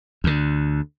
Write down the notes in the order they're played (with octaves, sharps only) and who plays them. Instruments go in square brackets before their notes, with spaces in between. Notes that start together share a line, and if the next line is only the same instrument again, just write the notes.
[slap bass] D2 D3